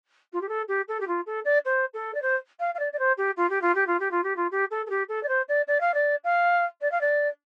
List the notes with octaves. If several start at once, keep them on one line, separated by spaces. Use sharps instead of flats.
F4
G4
A4
G4
A4
G4
F4
A4
D5
C5
A4
D5
C5
F5
F5
D5
D5
C5
G4
F4
G4
F4
G4
F4
G4
F4
G4
F4
G4
A4
A4
G4
A4
D5
C5
D5
D5
F5
D5
F5
D5
F5
D5